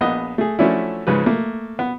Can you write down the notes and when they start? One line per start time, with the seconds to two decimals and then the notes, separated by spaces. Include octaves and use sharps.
0.01 A#1 B3 D#5
0.38 A3 G#4
0.59 F3 F#3 A3 C#4 D4 E4
1.07 G#2 C#3 F3 B4
1.26 A3 A#3
1.79 B3